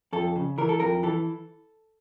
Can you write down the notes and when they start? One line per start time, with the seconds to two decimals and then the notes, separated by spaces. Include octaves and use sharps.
0.13 F2 A4
0.36 C#3
0.58 E3 A#4
0.69 A4
0.80 F2 A#4
1.03 E3 A4